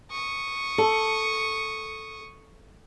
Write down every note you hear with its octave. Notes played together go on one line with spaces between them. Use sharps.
C#6 D#6
A4